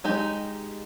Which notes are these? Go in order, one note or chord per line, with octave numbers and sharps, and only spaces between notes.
G#3 D#4 G4